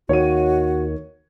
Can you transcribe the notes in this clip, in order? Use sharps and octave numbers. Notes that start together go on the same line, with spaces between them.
D#2 D#3 F#4 C#5 D#7